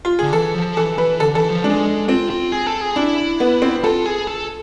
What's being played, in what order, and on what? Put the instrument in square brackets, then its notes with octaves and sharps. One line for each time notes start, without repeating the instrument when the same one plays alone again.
[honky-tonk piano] F4
[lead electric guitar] D3 [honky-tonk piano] G#4
[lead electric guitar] E3 [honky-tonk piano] A4
[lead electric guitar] F3
[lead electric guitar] E3 [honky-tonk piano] A4
[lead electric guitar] E3 [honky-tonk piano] B4
[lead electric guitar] D3 [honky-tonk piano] A4
[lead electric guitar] E3 [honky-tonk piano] A4
[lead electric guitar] F3
[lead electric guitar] G#3 [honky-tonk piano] D4
[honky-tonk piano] C4 [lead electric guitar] F4
[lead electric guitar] F4
G#4
A4
G#4
[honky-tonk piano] D4 [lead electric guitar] E4
[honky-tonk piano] B3
C4
[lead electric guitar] F4 [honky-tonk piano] A4
[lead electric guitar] G#4
A4